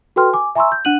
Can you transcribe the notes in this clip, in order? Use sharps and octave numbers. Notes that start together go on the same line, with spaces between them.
F#4 A4 B4 G5 C6 F6
G#5 D6
E5 G#5 A#5 C6 C#6 E6
G6
D4 F#5 F#6 D#7 F#7